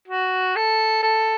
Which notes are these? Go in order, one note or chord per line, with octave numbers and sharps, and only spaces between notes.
F#4
A4
A4